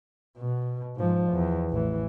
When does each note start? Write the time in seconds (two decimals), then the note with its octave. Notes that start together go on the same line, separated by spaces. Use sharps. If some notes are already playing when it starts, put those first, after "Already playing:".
0.38 B2
0.96 G#2 F3
1.32 E2
1.71 A1 E3